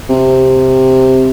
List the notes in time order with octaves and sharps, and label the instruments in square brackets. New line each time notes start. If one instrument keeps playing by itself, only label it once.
[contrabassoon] C3